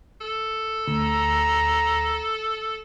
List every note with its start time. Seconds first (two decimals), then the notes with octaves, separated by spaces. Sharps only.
0.21 A4
0.88 D2 A#5